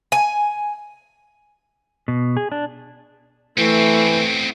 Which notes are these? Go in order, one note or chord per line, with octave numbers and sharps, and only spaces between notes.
G#5
B2
G#4
D4
E3 A3 B3 C4